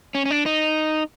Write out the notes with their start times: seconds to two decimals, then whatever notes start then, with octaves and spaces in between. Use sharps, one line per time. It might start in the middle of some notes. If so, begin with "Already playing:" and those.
0.15 C#4
0.25 C#4
0.31 D4
0.46 D#4